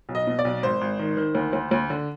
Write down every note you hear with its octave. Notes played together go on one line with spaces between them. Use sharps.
B1
D#5
B2
D5
B1
G#1 C5
G#1
D#3
D#3
D2
D2
D2
D3